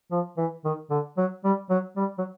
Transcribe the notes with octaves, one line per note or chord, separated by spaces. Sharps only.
F3
E3
D#3
D3
F#3
G3
F#3
G3
F#3